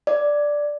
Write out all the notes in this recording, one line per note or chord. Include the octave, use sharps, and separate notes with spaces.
D5